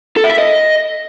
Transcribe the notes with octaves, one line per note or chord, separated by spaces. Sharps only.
A4
E4
E5
D#5